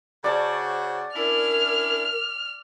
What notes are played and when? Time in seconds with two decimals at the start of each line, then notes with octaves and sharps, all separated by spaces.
0.24 C#3 F#4 C5 D5 A5
1.16 C#4 D4 E4 A#4 F6